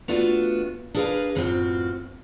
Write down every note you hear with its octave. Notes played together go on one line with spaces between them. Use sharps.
A3 B3 D4 F4 F#4
D4 G#4 A#4 B4 F5
F#2 A2 C4 F4 F#4